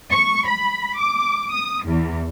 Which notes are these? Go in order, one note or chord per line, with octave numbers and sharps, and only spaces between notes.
C#6
B5
D6
D#6
E2